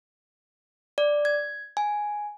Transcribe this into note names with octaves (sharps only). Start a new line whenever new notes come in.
D5
G#6
G#5